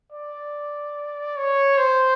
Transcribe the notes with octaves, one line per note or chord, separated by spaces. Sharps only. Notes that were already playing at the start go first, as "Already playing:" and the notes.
D5
C#5
C5